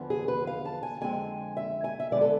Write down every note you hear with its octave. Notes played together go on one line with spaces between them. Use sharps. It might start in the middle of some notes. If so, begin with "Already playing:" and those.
Already playing: E2 D3 F3 B3
G#4
B4
F5
A5
G#5
F2 D3 G#3 C4 G#5
E5
G#5
E5
D3 G#3 B3 D5
A4